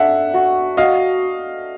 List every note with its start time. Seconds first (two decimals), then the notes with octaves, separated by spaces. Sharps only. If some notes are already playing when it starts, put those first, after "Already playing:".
Already playing: D4 A4 E5 F#5
0.34 F#4
0.77 F#4 D#5 F5